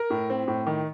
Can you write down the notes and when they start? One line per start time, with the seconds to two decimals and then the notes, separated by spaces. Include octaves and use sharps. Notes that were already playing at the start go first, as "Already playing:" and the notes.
Already playing: A#4
0.10 A2
0.30 C4
0.48 A2
0.67 D#3